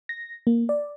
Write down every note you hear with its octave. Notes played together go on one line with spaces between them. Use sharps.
A#6
A#3
D5